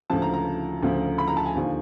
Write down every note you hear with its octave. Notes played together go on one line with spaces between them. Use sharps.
D2 C#3 F3 A5
A#5
A#5
D2 C#3 F3
B5
A#5
A5
G#5
D#2 D3 F3